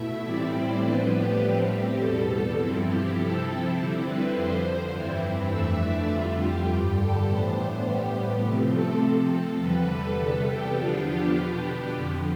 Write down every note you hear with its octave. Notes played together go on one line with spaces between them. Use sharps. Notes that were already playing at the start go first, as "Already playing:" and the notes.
Already playing: B2 A3 E4 E5
A2 E3 G3 C4 E4 D5
C5
A2 F3 B3 D4 B4
G4
A2 G3 C4 G4
E2 B2 G3 A4
G2 F3 C4 E4
G4
C3 F3 C4 E4 A4
D3 G3 C4 E4
B4
F2 D3 F3 C5
G2 E3 G3 C4 E4
F2 E3 A3 D4 E5
D5
F2 D3 G3 F4
G4
G2 D3 G3
A4
A2 E3 B3 D4 C5
A2 G3 B3 G4
C3 F3 A3 C4
A4
C3 F3 C4 A4
A4
E2 D3 G3 B4
A4
E2 C3 G3 B3
G4
E2 D3 F3 B3 D4 F4
G4
B2 B3 D4 G4
F2 D3 F3